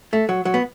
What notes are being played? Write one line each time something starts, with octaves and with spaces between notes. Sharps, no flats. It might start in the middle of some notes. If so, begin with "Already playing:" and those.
A3
F#3
F#3
B3